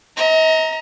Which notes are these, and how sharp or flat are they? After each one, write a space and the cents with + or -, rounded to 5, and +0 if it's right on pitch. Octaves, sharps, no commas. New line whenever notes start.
D#5 +45 A#5 +0